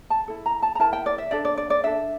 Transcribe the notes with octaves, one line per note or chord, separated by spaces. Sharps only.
A5
E4 A4
A#5
A5
A#5
E4 A#4 A5
G5
D5
E5
D4 A4 D5
D5
D5
D5
D4 A4 E5